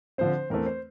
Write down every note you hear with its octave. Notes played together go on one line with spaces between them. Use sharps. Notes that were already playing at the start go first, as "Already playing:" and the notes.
D3 F3 C4 C5
E2 E3 A3 C4 A#4
C5